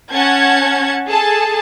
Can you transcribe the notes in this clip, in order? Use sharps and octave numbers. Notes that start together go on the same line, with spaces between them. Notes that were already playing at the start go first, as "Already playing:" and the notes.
C#4 F#5 A5 G#6
G#4 A4 A5